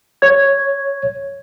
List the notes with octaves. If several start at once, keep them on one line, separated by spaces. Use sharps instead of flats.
C#5 G#6